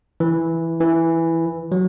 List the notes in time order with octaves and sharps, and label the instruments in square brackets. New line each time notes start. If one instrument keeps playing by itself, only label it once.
[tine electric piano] E3
E3
F#3